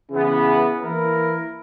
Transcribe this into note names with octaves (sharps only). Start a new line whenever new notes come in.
C#3 E3 B3
E3 A#3 E4 A#4